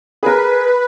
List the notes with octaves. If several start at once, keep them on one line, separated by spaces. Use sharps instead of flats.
G#4 A#4 B4